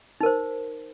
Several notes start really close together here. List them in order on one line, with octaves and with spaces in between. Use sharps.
D#4 A#4 C5